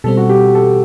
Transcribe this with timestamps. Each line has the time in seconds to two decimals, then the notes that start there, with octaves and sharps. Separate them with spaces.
0.04 B2 G3 C4 A4
0.17 F#4
0.29 G4
0.55 A4